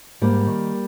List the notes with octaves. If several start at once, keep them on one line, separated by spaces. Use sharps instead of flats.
G#2 G3 A#3
D#3